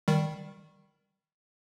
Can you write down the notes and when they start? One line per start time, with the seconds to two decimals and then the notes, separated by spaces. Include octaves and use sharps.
0.08 D#3 G3